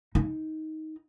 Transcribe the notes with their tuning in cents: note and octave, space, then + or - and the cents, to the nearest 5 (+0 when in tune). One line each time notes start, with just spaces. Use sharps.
D#4 +15